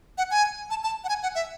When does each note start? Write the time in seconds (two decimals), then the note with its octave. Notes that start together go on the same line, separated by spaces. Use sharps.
0.18 F#5
0.31 G#5
0.70 A5
0.83 A5
1.04 F#5
1.09 G#5
1.23 F#5
1.35 E5